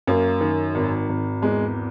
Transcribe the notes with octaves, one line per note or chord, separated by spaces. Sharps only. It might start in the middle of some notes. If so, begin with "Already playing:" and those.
F#2 A#3
D#3
G#1
G#1
E2 G#3